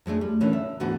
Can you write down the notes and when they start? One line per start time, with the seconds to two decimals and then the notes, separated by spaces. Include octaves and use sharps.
0.06 F2 G#3 A3 D4
0.21 G3
0.41 A#2 D3 E3 C#4
0.53 E5
0.80 D2 G#2 D3 E3 B3 F#4